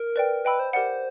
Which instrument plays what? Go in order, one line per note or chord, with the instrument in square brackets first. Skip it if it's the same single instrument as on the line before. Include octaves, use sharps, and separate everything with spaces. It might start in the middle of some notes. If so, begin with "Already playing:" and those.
Already playing: [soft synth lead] A#4
[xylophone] B4 D5 G5
[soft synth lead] B4 [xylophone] D#5 G5 B5 E6
[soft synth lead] C5
[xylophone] G4 A#4 D5 F#5 [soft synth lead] C5